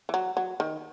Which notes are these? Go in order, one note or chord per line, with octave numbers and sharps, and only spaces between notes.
E3
F#3
F#3
D#3